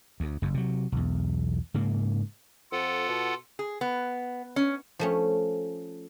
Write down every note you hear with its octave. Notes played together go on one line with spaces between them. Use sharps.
D2
F#1 F#2
C3 F#3
B1 E2
G#2 C#3 A#3
F2 F4 A4 F#5
B2
G#4
B3
C#4
F3 A3 C#4